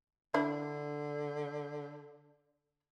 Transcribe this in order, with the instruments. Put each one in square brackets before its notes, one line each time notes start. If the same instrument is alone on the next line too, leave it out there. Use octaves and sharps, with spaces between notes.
[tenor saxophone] D3 [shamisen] D4 E4